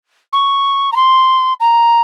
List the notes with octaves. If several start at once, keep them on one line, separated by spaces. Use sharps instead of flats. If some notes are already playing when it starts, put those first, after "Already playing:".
C#6
A#5
C6
A#5